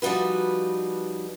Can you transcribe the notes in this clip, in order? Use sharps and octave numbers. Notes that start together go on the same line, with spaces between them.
F3 G3 D#4 F#4 B4